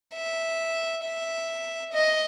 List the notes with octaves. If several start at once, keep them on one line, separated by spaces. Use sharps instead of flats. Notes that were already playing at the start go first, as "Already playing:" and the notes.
E5
E5
D#5